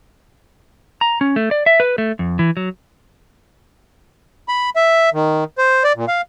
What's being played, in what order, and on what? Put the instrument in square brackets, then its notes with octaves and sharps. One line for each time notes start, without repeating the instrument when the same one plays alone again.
[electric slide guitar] A#5
C#4
A3
D5
E5
B4
A3
F2
E3
F#3
[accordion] B5
E5
D#3
C5
D5
A#2
F5